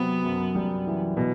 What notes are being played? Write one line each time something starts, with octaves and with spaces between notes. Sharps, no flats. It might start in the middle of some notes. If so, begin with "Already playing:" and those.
Already playing: C3 F#3 B3 C4
F#2
G3
E3
B2